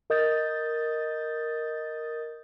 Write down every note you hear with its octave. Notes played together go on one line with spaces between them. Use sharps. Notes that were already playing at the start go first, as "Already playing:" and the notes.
A#4 D#5 D#6 G6 A6